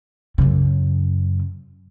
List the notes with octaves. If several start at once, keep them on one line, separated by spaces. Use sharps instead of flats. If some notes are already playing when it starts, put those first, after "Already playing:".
F#2 C#3